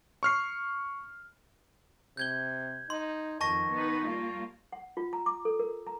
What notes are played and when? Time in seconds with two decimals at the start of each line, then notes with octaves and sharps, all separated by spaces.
0.23 C#6 F6 C7
2.17 C3 G6 G#6 G7
2.90 D#4 C6
3.41 F2 D#3 A5 C#6 A#6
3.72 B3 D#4 B4
4.05 G3 A#3 F4
4.72 F#5
4.97 F4
5.13 A#5
5.26 D6
5.45 A4
5.59 A#4
5.87 A#5